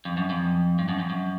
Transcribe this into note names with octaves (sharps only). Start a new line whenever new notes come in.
F2
F#2
F2
G2
F#2
F2
F#2